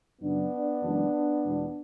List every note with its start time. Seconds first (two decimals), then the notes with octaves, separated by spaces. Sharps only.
0.22 F#2 C#3 F#3 B3 D4
0.82 F#1 F#2 E3 G#3
1.43 E2 B2 G#3